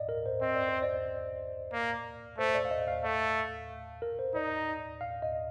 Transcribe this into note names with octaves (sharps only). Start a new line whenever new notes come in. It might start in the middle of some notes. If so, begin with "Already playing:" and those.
Already playing: D5 D#5 F5
A#4
C5
C4 D#5
D5
C5
D5
A#3
A3 C5
D5
F5
D#5
F5
A3
A#4
C5
D#4 D5
F5
D#5